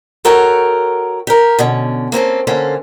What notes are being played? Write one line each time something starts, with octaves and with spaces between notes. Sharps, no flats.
F#4 A4 A#4 C#5 G5
G4 A#4
B2 D3 C#4
A#3 C4 C#4 A4
D3 A#3 C#4 A4 C5